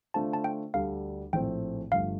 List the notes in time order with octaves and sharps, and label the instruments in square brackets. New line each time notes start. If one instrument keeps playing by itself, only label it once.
[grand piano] D3 A3 D4 F4 C5 [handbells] A5
[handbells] A5
G5
[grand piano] D2 D3 G3 D4 A4 [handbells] F5
[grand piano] A#1 A2 A3 C4 [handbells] G5
[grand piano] G1 G2 F3 A3 [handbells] F5